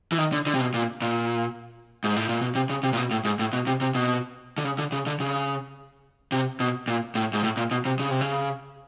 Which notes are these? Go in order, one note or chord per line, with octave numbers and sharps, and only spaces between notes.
E3
D#3
D3
D3
C3
B2
A#2
A#2
G#2
A2
A#2
B2
C3
C#3
C3
A#2
B2
A2
G#2
A2
B2
C3
C3
B2
D3
C#3
D3
C#3
D3
C#3
C3
B2
A#2
A2
G#2
A2
A#2
B2
C3
C#3
C3
C#3